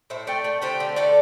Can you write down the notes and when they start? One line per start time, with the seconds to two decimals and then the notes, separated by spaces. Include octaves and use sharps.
0.10 A2 C5 E5
0.27 A3 D5 G5
0.44 A3
0.62 D3 G4 C5
0.80 D3
0.96 A3 A4 D5